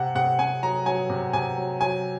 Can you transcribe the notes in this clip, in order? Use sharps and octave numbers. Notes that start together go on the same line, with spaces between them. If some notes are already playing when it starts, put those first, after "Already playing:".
Already playing: C3 F#5
C3 F#5
C3 G#5
F#3 A#5
F#3 G#5
C3
C3 G#5
F#3
F#3 G#5